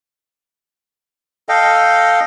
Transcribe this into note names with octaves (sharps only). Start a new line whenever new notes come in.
A4 D#5 F5 G5